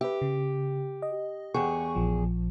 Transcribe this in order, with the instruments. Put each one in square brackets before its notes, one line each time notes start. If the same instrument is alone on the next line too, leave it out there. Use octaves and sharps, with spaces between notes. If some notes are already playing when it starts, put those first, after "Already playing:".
[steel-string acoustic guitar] G4 [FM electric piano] B4 E5
[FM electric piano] C#3
D#5
[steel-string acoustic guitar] E2 G#4 [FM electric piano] F#5 G5 C#6
[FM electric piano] A#1 F3